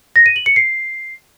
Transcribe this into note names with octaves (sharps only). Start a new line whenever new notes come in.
A#6
D#7
F#7
C#7
C7